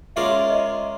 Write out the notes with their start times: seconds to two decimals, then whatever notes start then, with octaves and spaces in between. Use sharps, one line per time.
0.16 G#3 C#4 F4 A#4 D5 E5
0.50 D#5